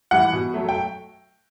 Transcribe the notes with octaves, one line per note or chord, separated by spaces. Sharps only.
E3 G3 F#5
B2
F#3 A3
G5